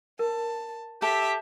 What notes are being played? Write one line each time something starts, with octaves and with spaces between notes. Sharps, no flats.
A#4 A5
G4 A4 E5